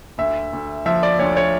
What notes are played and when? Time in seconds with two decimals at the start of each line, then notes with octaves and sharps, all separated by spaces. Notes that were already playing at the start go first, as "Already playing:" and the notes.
0.18 D2 E5
0.53 D2
0.86 F3 E5
1.03 D5
1.19 D2 C#5
1.37 C#5